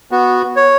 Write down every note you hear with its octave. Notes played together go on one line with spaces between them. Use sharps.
B3 F#4
C#5